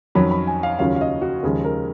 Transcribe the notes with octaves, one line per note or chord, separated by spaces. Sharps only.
F2 D#3 F#3 C#4 B5
B5
G#5
F5
D#2 C#3 F#3 C#4 F4 F5
F5
D#5
F#4
D#2 C#3 F3 G#3 G#4
A#4